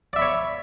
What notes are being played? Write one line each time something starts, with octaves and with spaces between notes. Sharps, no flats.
C#5 D5 E5 B5